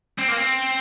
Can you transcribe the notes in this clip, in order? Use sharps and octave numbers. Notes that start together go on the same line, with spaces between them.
C4
A#3
C4